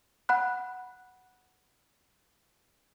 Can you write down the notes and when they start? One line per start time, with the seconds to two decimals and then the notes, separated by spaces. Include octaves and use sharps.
0.29 F#5 B5 F#6